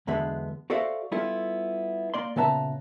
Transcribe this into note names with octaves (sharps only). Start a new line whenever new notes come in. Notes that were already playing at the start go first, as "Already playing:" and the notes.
B1 E2 D3 G#3 B3 E5
F#4 A4 C5 D5 E5 F5
G3 B3 E4 F4 A4
A#3 D5 C6
A#2 C#3 B3 E5 A5 A#5